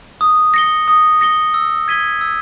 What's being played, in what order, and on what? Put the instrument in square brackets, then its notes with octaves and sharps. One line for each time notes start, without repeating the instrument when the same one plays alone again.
[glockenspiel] D#6
A#6 C#7 G7
D#6
A#6 C#7 G7
E6
G#6 B6 D#7 G7
E6